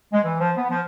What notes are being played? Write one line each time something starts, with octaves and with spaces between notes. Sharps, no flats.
G#3
E3
F3
B3
F3